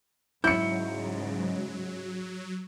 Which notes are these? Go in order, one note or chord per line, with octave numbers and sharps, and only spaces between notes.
G#2 C#3 F#3 G#3 E4 G6 C#7